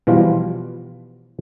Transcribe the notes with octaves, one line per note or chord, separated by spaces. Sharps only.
B2 E3 F3 G3 F4